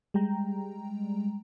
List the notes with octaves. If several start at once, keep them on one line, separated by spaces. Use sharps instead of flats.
G3 G#3 G5 A#5